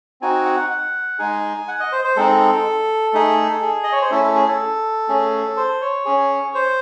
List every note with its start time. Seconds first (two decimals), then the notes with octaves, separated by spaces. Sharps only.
0.21 C4 D#4 F#4 G#5
0.46 F#5
0.70 F#5
1.19 G#3 D#4 G#4 G#5
1.68 F#5
1.80 D#5
1.92 C5
2.04 C5
2.16 G#3 C4 D#4 A4
3.13 A3 D#4 G#4
3.62 G#4
3.84 D#5
3.92 C#5
4.01 C5
4.10 A3 C#4 E4 A4
4.23 A4
4.35 G#4
4.48 A4
5.09 A3 C#4 G#4
5.57 C5
5.81 C#5
6.05 C#4 G#4
6.54 C5